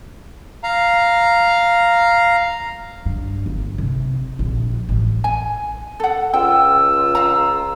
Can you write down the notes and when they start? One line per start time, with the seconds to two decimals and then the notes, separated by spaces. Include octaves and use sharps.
0.63 F5 A#5
3.06 G2
3.46 G1
3.78 C3
4.39 A#1
4.89 A1
5.24 G#5
6.00 A4 F#5
6.34 C#2 F4 G5 E6
7.15 F5 A#5